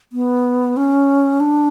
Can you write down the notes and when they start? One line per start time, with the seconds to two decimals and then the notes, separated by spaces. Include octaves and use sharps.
0.12 B3
0.77 C#4
1.40 D4